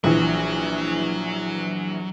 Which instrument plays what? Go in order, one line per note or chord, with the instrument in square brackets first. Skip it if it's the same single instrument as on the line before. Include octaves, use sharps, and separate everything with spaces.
[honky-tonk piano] A#1 E3 [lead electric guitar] F#3